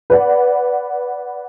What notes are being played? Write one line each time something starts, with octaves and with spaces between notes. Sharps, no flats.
B4 D5 F#5